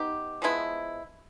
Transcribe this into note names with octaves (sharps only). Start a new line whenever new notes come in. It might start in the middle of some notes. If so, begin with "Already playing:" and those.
Already playing: B3 D#4 G4
F3 G#3 B3 E4